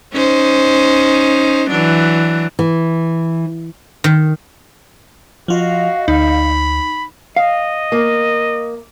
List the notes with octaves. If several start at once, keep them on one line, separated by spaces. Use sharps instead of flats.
C#4 D#4 C5
E3 F#3 D4
E3
D#3
F3 F4 F#4 D#5 F5
D2 D#4 B5
D#5 F5
A#3